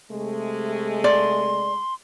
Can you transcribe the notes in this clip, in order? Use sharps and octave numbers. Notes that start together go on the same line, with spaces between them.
C3 G#3 A3
D5 C6